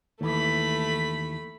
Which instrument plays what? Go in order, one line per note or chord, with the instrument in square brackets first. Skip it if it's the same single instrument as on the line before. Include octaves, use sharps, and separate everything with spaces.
[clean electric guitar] D#2 E3 [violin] A3 B5